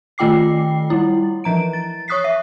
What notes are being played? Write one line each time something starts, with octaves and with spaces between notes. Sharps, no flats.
D#3 A3 F4 G5 D6 C7
G3 E4
E3 F3 A#5 D7
A6
C#5 C#6 D#6 F#6 B6 C7
E5